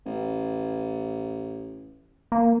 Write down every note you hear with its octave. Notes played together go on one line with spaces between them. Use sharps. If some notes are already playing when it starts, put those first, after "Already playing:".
A1
A#3